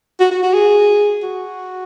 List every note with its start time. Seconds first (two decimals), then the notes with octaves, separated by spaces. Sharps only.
0.20 F#4
0.31 F#4
0.43 F#4
0.54 G#4
1.23 F#4